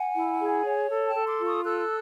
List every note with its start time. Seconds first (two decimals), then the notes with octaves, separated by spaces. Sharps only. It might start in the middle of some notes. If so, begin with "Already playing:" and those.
Already playing: F#5 G#5
0.15 E4
0.40 G#4
0.64 C#5
0.90 A4
1.07 G5 A5
1.15 A4
1.26 C6 D6
1.39 F4
1.45 C#6 D#6
1.64 A4 E6 F#6